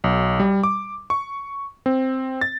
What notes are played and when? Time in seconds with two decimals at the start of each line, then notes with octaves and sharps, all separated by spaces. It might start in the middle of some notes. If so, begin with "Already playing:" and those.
0.04 B1
0.40 G3
0.64 D6
1.10 C#6
1.86 C4
2.41 A6